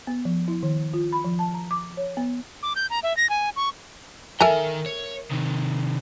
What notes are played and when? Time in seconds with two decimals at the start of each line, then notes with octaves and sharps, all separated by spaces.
0.07 B3
0.25 F3
0.48 E4
0.63 D#3
0.94 F4
1.13 B5
1.25 F3
1.39 A5
1.54 A#5
1.71 D6
1.97 C#5
2.17 B3
2.63 D6
2.76 G6
2.90 A#5
3.03 E5
3.17 A#6
3.30 G#5
3.56 C#6
4.40 D#3 A4 A#4 E5 G5 G#5 A#5
4.86 C#5
5.31 C3 D#3